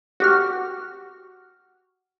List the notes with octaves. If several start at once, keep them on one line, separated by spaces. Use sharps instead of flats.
F#4 G4 F6